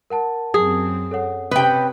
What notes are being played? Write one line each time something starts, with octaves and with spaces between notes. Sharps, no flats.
A#4 F#5 A5
F#2 C4 G#4
A4 C#5 F#5
C3 C#4 B4 G5 D#6